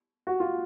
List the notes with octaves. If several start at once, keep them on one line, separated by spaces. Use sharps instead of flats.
F#4
F4